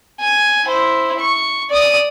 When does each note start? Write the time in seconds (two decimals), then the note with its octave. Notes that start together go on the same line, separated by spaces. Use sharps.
0.20 G#5
0.65 E4 C5
1.20 C#6
1.70 D5 D#6